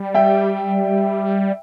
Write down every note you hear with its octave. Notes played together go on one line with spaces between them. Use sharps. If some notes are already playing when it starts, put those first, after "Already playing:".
Already playing: G3
E5 G5